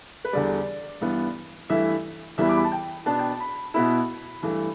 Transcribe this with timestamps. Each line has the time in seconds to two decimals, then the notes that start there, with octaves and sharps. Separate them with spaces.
0.25 B4
0.33 E2 D3 G3 D5
1.01 G2 E3 B3
1.69 G2 E3 A3 E4 E5
2.38 E2 E3 G3 B3 E4 E5
2.49 D6
2.57 B5
2.64 A5
2.72 G5
3.06 B2 B3 D4 A5
3.19 G5
3.29 A5
3.40 B5
3.74 B2 B3 E4 B5
4.42 G2 E3 A3